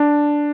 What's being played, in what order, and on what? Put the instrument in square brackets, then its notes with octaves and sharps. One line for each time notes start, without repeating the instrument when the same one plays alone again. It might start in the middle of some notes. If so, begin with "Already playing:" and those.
Already playing: [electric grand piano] D4